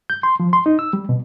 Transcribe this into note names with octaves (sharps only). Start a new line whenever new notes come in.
G6
C6
F3
C6
D#4
E6
G3
B2